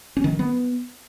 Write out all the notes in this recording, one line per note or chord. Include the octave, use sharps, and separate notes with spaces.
C#4
D#3
F#3
B3